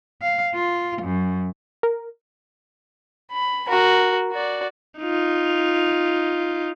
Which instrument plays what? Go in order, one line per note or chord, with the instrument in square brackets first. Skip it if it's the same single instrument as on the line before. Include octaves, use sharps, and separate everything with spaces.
[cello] F5
F4
F#2
[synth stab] A#4
[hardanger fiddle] B5
F#4 A#4
F#4 D5
[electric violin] D#4 F4